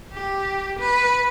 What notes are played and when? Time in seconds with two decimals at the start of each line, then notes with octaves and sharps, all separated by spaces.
0.13 G4
0.79 B4